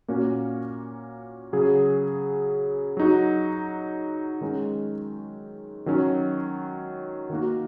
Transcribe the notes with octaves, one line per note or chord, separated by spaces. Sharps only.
A#2 A#3 C#4 F#4
C#3 F#3 C#4 G#4
F#3 D#4 F#4
D#3 G#3 C#4
D#3 F#3 C#4
D#3 A#3 F#4